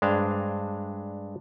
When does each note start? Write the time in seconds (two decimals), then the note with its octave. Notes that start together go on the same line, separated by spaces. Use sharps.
0.02 G2 G#3 D4 C5 F5